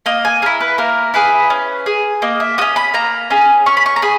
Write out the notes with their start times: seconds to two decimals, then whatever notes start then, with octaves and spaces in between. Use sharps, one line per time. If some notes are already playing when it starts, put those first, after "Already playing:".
0.06 A#3 D#5
0.25 G#5
0.42 E4 G#4 A#4
0.61 B4
0.78 A#3 A#4
1.14 E4 G#4 B4
1.50 C#4
1.86 G#4
2.22 A#3 D#5
2.40 E5
2.58 F#4 D#6
2.61 C#4
2.76 B5
2.94 A#3 A#5
3.30 C#4 G#4
3.66 C#4 C#6
3.77 B5
3.86 C#6
3.96 A#5
4.02 G#4 B5